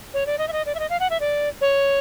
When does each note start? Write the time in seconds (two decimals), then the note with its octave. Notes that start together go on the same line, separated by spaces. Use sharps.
0.14 C#5
0.26 D5
0.38 D#5
0.48 E5
0.53 D#5
0.66 D5
0.75 E5
0.79 D#5
0.90 F5
1.00 F#5
1.10 E5
1.20 D5
1.61 C#5